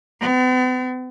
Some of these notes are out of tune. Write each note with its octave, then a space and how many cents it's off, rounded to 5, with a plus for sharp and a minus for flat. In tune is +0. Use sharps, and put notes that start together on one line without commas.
B3 +45